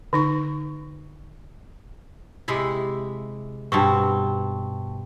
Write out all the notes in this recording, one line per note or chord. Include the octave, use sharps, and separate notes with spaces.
D3 D#4 C#6
C3 G#3 E4
G2 B2 C4 G5 A5 C#6